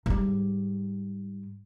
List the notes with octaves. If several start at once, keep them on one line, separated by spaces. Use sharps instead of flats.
G#2 G3